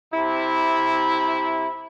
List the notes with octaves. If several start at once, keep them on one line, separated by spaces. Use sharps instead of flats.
C3 E4